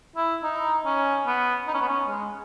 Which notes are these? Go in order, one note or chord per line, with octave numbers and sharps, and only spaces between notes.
E4
D#4
C#4
B3
D#4
C#4
B3
C#4
G#3